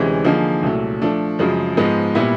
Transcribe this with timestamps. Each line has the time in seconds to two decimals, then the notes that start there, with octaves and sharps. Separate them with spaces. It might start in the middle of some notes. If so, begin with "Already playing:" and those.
Already playing: D2 C3 E3 G#3 C#4
0.24 D3 F3 A#3 D#4 G#4
0.63 C2 A#2 F#3 A3
1.02 F3 A3 D4
1.39 F#2 C#3 F3 G#3
1.77 G#2 F3 G#3 B3 D#4
2.15 A#2 G3 B3 E4